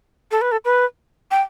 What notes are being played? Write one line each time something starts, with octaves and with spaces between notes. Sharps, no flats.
A4
B4
A4
B4
G5